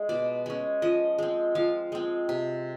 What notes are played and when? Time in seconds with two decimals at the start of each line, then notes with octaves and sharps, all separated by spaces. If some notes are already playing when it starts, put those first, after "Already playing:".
Already playing: G#3
0.09 B2 D5
0.46 G#3 C#4
0.82 F3 D#5
1.18 G#3 C4
1.55 F3 F5
1.92 G#3 C4
2.29 C3